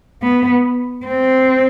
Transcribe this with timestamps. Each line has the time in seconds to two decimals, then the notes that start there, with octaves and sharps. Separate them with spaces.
0.23 B3
1.06 C4